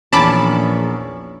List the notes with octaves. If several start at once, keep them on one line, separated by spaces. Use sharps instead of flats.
A#1 E2 C#4 A5 B5 D6 B6